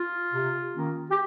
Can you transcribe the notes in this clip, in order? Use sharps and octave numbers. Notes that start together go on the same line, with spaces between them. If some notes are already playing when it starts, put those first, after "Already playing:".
Already playing: F4
C3
D#3 A#3 C#4
G4